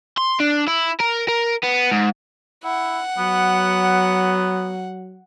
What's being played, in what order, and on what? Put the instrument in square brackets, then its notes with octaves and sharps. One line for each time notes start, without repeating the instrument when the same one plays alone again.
[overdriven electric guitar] C6
D4
E4
A#4
A#4
B3
G#2
[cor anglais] E4 [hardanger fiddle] F#5
[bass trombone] F#3 [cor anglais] B3